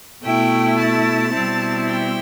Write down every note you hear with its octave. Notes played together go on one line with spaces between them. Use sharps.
B2 A3 E4 G5
A5
B2 G3 C4 E4
G5